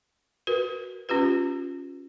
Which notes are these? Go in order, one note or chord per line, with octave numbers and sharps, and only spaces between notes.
F#4 A#4 B4
C#4 F4 G4 B4